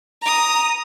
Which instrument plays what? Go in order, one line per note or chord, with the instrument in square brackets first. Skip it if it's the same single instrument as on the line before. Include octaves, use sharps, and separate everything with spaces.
[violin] A#5 D#6